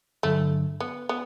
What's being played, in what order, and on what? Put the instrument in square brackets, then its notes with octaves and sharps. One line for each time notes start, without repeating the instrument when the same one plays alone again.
[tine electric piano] G2 D3 F#3 [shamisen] A3
[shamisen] B3
B3